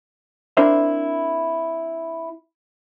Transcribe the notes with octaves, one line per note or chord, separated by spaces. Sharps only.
C4 D4 E4 A#4 C5 E5